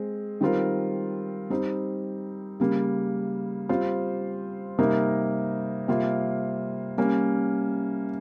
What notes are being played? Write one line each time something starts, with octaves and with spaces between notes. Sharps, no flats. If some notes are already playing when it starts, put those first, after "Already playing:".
Already playing: G#3 C4
D#3 G3 C4 F4 A#4
G3 C4 D#4
C#3 G3 A#3
G3 C4 F4 C5
C3 G3 A#3 D#4 A#4
C3 G3 A#3 F4
G3 A#3 C#4